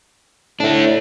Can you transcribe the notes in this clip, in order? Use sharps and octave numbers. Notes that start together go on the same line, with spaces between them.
A2 A3 D4